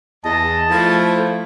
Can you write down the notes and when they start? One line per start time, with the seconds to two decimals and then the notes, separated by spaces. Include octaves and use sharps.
0.25 E2 D#5 A5
0.70 F3 A3 E4